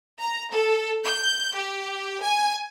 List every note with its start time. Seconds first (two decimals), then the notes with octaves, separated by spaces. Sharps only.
0.21 A#5
0.52 A4
1.04 G6
1.55 G4
2.22 G#5